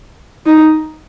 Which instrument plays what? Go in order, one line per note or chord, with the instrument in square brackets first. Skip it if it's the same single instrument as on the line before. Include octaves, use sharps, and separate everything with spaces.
[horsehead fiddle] D#4